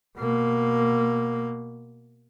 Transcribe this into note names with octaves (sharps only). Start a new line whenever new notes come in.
B2 A#3